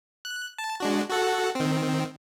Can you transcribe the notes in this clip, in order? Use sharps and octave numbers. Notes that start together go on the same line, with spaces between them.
F#6
A5
G#3 D4 F#4
F#4 A4 F#5
D#3 C4